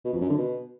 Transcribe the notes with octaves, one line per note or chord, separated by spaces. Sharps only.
B2
F2
F#2
D3
B2